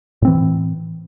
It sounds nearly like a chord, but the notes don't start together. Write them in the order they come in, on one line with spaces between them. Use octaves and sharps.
A2 C4 E3